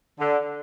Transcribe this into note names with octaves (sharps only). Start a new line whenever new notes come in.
D3